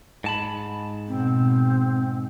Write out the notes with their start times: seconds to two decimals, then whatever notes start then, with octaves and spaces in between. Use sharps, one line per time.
0.24 G#2 A5 B5
1.08 B2 C4